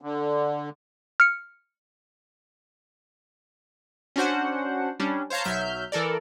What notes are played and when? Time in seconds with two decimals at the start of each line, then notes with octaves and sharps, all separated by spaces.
0.01 D3
1.20 F6 C#7
4.16 C#4 D4 F#4 C5 F#5
4.99 G3 C#4 D4
5.30 C5 C#5 F5 A5 A#5
5.44 B1 F#3 E5 F6 G6
5.92 E3 A4 A#4 D5